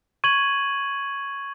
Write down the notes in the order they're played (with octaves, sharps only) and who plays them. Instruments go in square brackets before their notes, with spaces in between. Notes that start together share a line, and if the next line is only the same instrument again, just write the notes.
[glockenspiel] C#6 G#6 D#7 F#7